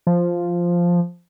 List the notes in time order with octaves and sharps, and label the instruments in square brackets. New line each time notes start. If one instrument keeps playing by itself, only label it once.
[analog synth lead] F3